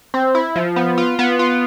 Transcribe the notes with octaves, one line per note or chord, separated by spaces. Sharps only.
C4
E4
F3
B3
F4
B3
F4